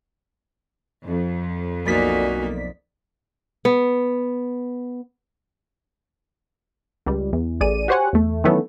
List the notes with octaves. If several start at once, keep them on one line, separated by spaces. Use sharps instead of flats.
F2
B1 A#3 D#4 F#4 D5 G#5 B6
B3
C#2 G3
E2
A1 G#4 D5 D#7
F#4 G4 C5 C#5 F#5 G#5
E2 A3
D#3 E3 F#3 A3 B3 C#4